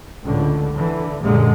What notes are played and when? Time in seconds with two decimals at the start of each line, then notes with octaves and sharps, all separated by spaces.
0.24 C#2 A2 D3
0.74 D3 E3
1.22 A1 F#2 A#2 D3 G#3